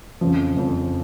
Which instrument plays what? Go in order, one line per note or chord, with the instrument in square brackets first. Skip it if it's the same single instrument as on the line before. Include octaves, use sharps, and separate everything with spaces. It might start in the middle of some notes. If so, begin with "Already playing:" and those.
[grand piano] F2 C#3 F3
F2 C#3 F3